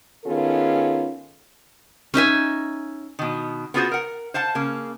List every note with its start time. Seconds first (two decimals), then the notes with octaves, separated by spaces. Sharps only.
0.25 D#3 B3 C#4 F4 G#4 A4
2.14 C#4 D#4 E5 G#5
3.19 B2 D#3
3.74 B3 F4 F#4 G#4 A4 C5
3.91 A#4 F#5
4.34 C5 F5 F#5 A5
4.55 C#3 A#3